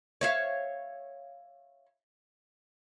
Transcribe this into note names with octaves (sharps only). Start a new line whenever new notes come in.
C#5 E5 F5